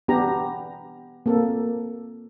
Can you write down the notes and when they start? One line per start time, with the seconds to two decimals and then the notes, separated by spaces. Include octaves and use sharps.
0.08 B3 D4 G4 A#5
1.26 A#3 C4 A4